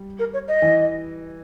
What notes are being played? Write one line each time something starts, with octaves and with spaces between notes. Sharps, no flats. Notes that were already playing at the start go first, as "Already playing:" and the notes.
Already playing: G3
A#4
C#5
D#5
E3